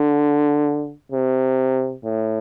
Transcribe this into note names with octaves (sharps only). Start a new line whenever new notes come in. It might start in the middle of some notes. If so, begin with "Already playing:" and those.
Already playing: D3
C3
A2